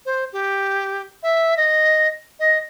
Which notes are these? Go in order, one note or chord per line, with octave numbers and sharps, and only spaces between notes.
C5
G4
E5
D#5
D#5